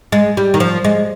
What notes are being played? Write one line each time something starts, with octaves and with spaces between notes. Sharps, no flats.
G#3
G3
D#3
F3
G#3